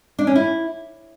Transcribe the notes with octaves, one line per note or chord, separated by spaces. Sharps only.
D4
C#4
E4